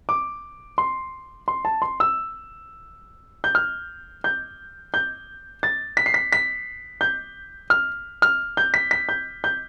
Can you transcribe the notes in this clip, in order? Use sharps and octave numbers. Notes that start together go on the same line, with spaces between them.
D6
C6
C6
A5
C6
E6
G6
F6
G6
G6
A6
B6
C7
B6
B6
G6
F6
F6
G6
B6
B6
G6
G6